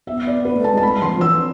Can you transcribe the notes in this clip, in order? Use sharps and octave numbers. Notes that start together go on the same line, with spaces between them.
B3 E5
D5
B3 B4
A3
A5
G#3
A5
A3 B5
G#3
E3 C6
F3
E3 E6